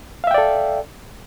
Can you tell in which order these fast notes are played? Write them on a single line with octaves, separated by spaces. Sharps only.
F5 E5 G5 D5 A4